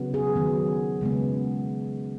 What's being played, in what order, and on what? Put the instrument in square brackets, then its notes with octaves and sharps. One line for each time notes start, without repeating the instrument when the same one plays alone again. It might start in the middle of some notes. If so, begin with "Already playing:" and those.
Already playing: [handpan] C#3 F#3 B3
G#4
D#3 F#3 B3
C#3 G#3 B3